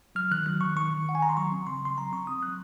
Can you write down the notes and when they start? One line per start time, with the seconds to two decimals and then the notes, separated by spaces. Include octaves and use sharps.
0.15 F#3 F6
0.31 D#3 F#6
0.46 F#3 F#6
0.61 D#3 C#6
0.76 D#3 C#6
0.92 D#3
1.06 D#3 F#5
1.15 G#5
1.22 D#3 A#5
1.29 C6
1.37 F#3 C#6
1.52 C4
1.67 C#3 C6
1.82 C#3 C6
1.97 F#3 A#5
2.12 C4 C#6
2.27 C4 D#6
2.43 F#3 F#6